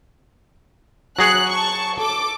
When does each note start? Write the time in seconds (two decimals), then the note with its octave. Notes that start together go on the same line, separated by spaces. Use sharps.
1.19 F#3 G#4 C#5 F#6
1.51 A5 C#6
1.97 A4 D6